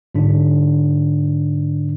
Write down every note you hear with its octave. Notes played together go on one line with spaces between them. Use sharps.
G#2 D3 D4